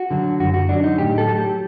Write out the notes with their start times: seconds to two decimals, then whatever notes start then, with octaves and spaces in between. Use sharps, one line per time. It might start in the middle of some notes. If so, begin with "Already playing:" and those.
Already playing: F#4
0.11 D3 F#3
0.40 F#2 F#4
0.54 F#4
0.69 D3 F#3 D4
0.84 D#4
0.98 A2 G4
1.18 A4
1.28 F#3
1.38 G4